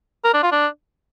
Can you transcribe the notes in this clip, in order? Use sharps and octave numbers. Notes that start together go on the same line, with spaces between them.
A#4
D4
F4
D4